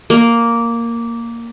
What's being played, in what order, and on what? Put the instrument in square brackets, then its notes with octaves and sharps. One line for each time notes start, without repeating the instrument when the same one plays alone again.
[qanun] A#3